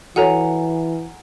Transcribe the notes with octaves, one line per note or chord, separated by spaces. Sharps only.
E3 F#4 A4 C#5 F#5 G#5 A#5